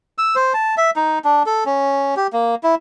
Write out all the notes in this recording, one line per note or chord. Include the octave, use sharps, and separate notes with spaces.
E6
C5
A5
E5
D#4
D4
A4
C#4
G4
A#3
E4